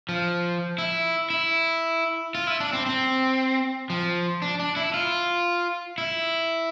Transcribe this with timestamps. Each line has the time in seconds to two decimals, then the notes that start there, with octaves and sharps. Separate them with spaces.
0.09 F3
0.78 E4
1.30 E4
2.35 F4
2.47 E4
2.60 D4
2.73 C4
2.86 C4
3.90 F3
4.42 D4
4.60 D4
4.77 E4
4.94 F4
5.98 E4